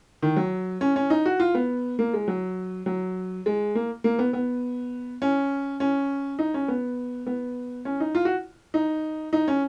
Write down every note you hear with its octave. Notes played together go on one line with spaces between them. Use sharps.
D#3
F#3
C#4
C#4
D#4
F#4
F4
B3
A#3
G#3
F#3
F#3
G#3
A#3
A#3
B3
B3
C#4
C#4
D#4
C#4
B3
B3
C#4
D#4
F4
F#4
D#4
D#4
C#4